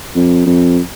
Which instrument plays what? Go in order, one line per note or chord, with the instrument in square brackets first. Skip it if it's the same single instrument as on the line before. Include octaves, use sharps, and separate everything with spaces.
[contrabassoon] F2
F2